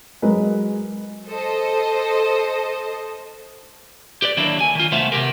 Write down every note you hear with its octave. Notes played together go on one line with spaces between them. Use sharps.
F#3 G#3 A#4 B4
A4 C5 D#5
G4 B4 D5
D3 D#3 F#3 A#3 D4 E4
G#5
D#3 F4
C2 A3 B3 C5 E5 F5
C3 B3 G4 A#4